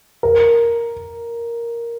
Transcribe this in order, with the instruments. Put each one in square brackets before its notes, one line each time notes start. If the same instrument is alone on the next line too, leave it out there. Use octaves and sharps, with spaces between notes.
[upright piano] A#4